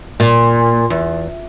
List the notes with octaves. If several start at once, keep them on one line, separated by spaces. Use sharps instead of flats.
A#2
E2